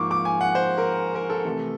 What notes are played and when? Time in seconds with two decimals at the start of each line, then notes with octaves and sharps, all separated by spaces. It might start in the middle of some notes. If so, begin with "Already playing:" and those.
Already playing: G#2 F3 A#3 C#6 D6
0.11 D6
0.25 G#5
0.41 F#5
0.55 C5
0.78 A#4
1.15 A#4
1.30 A4
1.45 C3 E3 A3